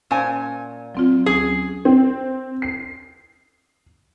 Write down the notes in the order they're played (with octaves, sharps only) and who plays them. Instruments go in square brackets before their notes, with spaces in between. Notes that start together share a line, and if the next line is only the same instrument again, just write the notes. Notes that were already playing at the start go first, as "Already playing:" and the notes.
[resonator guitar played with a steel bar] A#2 G#5 [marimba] C#4 C5
[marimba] F#3 C4 F4
[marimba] D2 F#3 C#4 [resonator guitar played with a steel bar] G#4
[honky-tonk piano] C4
C7